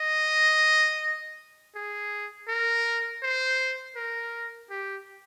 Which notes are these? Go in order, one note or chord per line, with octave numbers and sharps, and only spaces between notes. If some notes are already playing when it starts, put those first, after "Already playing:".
Already playing: D#5
G#4
A#4
C5
A#4
G4